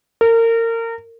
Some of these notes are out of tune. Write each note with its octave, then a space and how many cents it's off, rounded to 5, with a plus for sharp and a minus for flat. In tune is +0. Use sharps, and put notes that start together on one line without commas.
A#4 -30